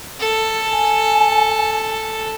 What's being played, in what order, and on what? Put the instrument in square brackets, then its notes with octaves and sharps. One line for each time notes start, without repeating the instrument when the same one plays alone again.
[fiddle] A4
[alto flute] G#5